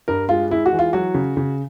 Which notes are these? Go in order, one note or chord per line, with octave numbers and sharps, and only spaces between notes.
G2 A#4
G#3 F4
G#3 E4
F#4
E3
F4
F#3 F#4
C#3
C#3